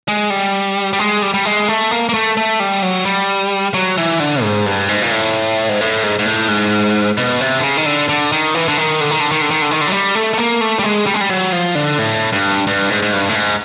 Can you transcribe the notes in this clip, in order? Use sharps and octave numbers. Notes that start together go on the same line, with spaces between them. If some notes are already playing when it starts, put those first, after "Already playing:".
G#3
G3
G3
G#3
G3
G3
G#3
A3
A#3
A#3
A3
A3
G3
F#3
G3
F#3
E3
D3
G#2
G2
G#2
A#2
A2
G#2
A2
G#2
G#2
A2
G#2
B2
C3
D3
C#3
D#3
D3
D3
D#3
E3
D3
D#3
D3
D#3
D3
D#3
D3
D#3
D3
D#3
D3
F#3
G3
A3
A3
A#3
A3
G3
G#3
G3
G#3
G3
F#3
F3
D3
A2
G2
G2
G#2
G#2
G2
A2
G#2